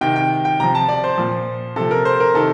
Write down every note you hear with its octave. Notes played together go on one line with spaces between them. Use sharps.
C3 D#3 G5
G5
G5
C3 F3 A#5
A5
D5
C5
A#2 F3
C3 F3 A4
A#4
C5
A#4
C3 D#3 A4